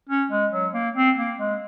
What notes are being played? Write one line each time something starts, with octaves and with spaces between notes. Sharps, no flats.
C#4
G#3
F#3
A#3
C4
A#3
G#3